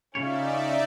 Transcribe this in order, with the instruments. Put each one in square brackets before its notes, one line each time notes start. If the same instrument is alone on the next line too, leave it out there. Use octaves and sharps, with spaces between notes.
[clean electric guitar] C#3 C#5 [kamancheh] C#4 F4 [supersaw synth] D#4 D5 E5